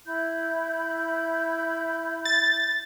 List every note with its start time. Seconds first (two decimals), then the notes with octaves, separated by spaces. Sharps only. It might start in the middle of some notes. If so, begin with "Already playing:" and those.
0.06 E4 B5 G6
2.25 A6